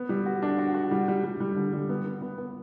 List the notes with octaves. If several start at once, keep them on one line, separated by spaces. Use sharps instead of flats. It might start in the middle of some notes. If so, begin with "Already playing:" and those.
Already playing: B3
G3
F#4
D4
F#4
F#4
G3
G3
G3
G3
D3
G3
B3
B3
B3
B3